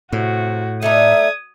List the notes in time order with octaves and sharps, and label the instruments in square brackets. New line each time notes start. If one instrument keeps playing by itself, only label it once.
[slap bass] A2 [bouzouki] C3 [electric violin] F#4
[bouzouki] A3 D4 D#4 [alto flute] E5 [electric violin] D#6 G#6